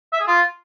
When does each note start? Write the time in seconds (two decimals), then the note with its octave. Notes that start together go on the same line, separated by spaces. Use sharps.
0.13 E5
0.20 G#4
0.27 F4